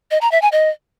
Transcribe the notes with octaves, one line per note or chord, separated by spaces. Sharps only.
D#5
A#5
E5
G#5
D#5